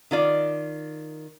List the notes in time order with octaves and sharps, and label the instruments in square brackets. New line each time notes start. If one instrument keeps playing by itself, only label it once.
[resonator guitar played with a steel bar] D#3 F4 D5